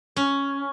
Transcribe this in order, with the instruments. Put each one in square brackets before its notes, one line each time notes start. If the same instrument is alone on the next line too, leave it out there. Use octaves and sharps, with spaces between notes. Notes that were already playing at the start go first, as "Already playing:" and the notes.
[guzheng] C#4